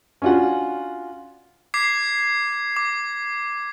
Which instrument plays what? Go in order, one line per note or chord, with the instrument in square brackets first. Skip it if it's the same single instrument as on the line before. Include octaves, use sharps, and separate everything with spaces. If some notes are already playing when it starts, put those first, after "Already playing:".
[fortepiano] C#4 D4 F4 F#4 F#5
[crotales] D6 G#6 B6 C7
D6